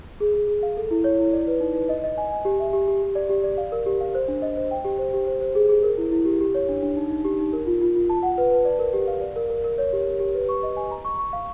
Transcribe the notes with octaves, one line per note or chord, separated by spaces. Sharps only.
G#4
G#4
G#4
F5
A4
E4
C#5
E4
D5
B4
D#4
B4
D#5
D#5
G#5
G#5
G4
E5
G4
G4
G4
D5
G4
D5
F5
A#4
G4
F5
C5
D4
D#5
C5
G5
G4
C5
G4
C5
C5
G#4
G#4
A#4
E4
E4
G4
G4
C#5
D4
D4
D#4
D#4
G4
D#4
A#4
F4
F4
F4
A5
F#5
B4
B4
D5
A#4
G4
F5
D5
A#4
A#4
A#4
C#5
G4
G4
G4
B4
C#6
D#5
G#5
A#5
C#6
C#6
F5